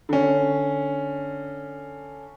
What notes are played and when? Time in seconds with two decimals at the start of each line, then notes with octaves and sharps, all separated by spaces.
0.09 D3 C#4